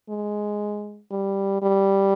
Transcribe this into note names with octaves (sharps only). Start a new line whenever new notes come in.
G#3
G3
G3